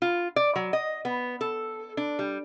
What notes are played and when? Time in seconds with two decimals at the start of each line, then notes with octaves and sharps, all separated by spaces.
0.02 F4
0.36 D5
0.56 F#3
0.73 D#5
1.05 B3
1.41 A4
1.97 D4
2.19 G3